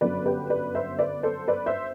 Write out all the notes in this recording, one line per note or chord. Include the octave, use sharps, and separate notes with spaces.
G1 F#2 D3 F#3 B3 B4 D5
G4 B4
B4 D5
C5 E5
B4 D5
A4 C5
B4 D5
C5 E5